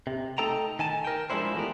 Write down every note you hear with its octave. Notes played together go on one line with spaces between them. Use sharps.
C3
A3 D#4 A4 G5 A5 A#5
D#3 G#5 A5
A#4 G5
F3 G#3 C4 D4 E4 C5
E3 A3 B3 G4 A#4